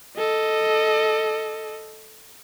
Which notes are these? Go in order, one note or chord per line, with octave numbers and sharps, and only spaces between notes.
A4 D#5